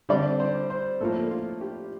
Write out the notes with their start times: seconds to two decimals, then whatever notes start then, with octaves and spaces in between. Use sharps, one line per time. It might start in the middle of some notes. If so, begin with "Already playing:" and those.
0.09 D3 G3 C4 D5
0.40 C5
0.70 C5
1.01 A2 F3 A#3 A4
1.31 F4
1.61 G4